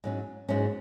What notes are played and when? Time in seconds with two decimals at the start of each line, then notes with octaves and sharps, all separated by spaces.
0.04 G#2 F#3 C#4
0.49 G#2 F#3 C#4